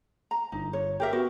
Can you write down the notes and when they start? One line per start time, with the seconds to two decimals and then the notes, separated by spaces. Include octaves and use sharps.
0.31 A#5
0.52 G1 D#4
0.73 C#5
1.00 G4 A#4 E5
1.13 B3 F#4